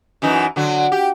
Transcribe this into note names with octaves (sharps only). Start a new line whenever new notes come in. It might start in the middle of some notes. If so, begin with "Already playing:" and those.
F#2 E3 D#4
D3 F#3
G4